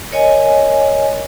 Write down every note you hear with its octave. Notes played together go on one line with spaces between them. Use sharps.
A#4 C#5 D#5 G#5